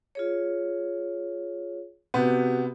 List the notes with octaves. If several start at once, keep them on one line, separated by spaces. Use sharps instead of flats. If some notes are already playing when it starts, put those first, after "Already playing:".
F4 G#4 C#5
C3 B3 F#4 G4